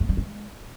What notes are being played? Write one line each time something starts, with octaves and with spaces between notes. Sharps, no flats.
A3
G3
G#3